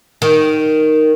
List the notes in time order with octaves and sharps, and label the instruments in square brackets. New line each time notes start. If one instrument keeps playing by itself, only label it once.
[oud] D#3